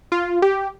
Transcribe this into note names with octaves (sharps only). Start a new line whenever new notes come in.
F4
G4